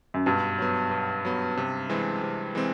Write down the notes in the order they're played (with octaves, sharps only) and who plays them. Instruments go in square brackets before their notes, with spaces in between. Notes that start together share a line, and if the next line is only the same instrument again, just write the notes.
[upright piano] F#2
[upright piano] G2 [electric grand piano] B2
[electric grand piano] F#3 B3
B2
F#3 B3
C3
E3 G#3 C4
C3
E3 G#3 C4